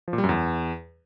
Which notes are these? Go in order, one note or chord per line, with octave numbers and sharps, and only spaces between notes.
F3
A#2
G3
F#2
E2